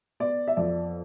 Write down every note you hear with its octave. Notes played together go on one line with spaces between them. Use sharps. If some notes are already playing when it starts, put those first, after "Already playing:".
B3 D5
E5
F2 D5